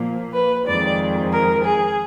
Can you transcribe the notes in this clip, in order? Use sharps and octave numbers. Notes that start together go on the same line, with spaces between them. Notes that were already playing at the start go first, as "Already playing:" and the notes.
Already playing: A#2 F3 A#3
B4
F2 D#3 G#3 D5
A#4
G#4